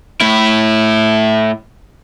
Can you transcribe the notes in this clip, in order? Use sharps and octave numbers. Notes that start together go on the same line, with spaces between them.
A2 E4